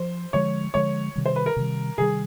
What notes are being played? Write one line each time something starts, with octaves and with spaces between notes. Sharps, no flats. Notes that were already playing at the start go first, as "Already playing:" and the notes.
Already playing: F3 C5
D3 F3 G#3 C#5
D3 F3 G#3 C#5
C3 D#3 G3
C5
B4
A#4
C3 D#3 G3
C3 D#3 G3 G#4